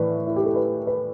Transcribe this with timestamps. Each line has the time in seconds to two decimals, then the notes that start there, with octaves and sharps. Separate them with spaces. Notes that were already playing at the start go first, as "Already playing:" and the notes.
Already playing: A2 E3 B4 D5
0.27 E4
0.36 G4
0.46 A4
0.56 B4
0.87 B4